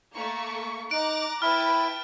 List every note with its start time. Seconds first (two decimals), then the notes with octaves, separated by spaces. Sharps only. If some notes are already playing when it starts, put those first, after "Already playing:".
0.12 A3 A#3 C#6
0.91 D#4 A#5 D6 F#6 D7
1.42 E4 B4 G5 A5 B5 F6